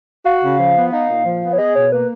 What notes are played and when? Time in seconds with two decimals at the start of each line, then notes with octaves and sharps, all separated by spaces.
0.24 F#4 F5
0.42 C#3
0.58 F3
0.76 B3
0.92 D#4 F5
1.09 A#2
1.25 F3
1.42 B3
1.53 C#5
1.58 G#4 D#5
1.75 B2 C#5
1.92 A#3 B4